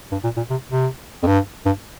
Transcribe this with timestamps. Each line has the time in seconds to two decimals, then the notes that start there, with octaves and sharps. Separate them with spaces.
0.12 G2
0.24 A#2
0.37 A#2
0.50 C3
0.70 C3
1.23 F2
1.27 G2
1.66 G2